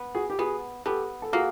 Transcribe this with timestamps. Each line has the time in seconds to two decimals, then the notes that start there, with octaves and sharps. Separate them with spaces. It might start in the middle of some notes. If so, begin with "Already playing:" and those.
Already playing: B3
0.15 F#4 G#4
0.30 G4
0.39 B3 F#4 G#4
0.86 B3 G4 A4
1.22 A4
1.33 A#3 F#4 G#4